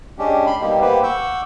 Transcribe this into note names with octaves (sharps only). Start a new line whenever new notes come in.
G#3 C#4 D4 G4
B5 C6
B2 G3 A#3 D#4 G4
A#3 B3 G4 B4 C5
F#5 C#6 D6 E6 G6